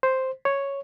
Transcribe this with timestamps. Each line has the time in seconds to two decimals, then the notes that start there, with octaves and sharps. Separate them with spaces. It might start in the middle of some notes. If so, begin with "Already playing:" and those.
0.03 C5
0.45 C#5